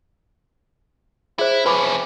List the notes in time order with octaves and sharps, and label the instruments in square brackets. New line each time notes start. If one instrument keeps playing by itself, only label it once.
[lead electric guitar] E4 [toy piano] G#4 C5
[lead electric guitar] F2 C#4 [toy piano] B4 B5 D6